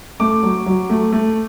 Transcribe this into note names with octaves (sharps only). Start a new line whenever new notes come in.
A3 D6
F#3
F#3
A3
A3